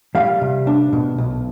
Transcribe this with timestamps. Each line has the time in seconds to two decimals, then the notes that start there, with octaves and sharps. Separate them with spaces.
0.15 G3 F5
0.41 C3
0.67 D4
0.93 B2
1.18 B1